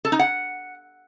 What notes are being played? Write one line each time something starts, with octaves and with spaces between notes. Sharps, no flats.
A4
D#4
F#5